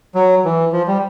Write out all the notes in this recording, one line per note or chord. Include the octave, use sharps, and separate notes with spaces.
F#3
E3
F3
G3